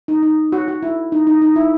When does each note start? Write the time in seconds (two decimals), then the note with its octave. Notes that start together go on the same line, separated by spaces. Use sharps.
0.08 D#4
0.23 D#4
0.52 F#4
0.68 F#4
0.83 E4
1.12 D#4
1.27 D#4
1.42 D#4
1.56 E4